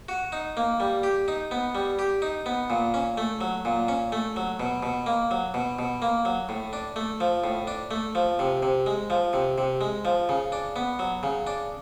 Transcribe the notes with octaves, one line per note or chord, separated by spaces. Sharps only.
F#4
D#4
A#3
G3
G4
D#4
B3
G3
G4
D#4
B3
A#2
C#4
A3
F#3
A#2
C#4
A3
F#3
B2
B2
A#3
F#3
B2
B2
A#3
F#3
A2
D4
A3
F3
A2
D4
A3
F3
C3
C3
G#3
F3
C3
C3
G#3
F3
C#3
D4
B3
F#3
C#3
D4